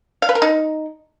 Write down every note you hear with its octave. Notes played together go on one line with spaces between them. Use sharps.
F5
B4
A#4
D#4